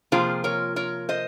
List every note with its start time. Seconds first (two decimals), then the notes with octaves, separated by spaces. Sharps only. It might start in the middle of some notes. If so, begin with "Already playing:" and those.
0.12 C3 F3 A#3 F4 G#4 C5
0.44 A#4 C#5
0.76 A#4 C#5
1.09 C5 D#5